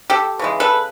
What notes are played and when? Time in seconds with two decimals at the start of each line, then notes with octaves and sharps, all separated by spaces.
0.10 G4 A4
0.39 C#3 E3 G#3
0.60 A4 B4